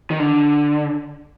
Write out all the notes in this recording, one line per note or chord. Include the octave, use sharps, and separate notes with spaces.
D#3
D3